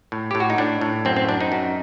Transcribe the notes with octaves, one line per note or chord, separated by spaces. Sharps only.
A2
A2 G4
F#4
D#4
A2 D4
A2
F#2 C4
C4
F#2 D4
D#4
F#2